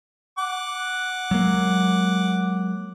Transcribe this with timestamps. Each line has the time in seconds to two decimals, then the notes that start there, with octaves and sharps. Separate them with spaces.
0.38 F#5 D6
1.31 F#3 G#3 A#3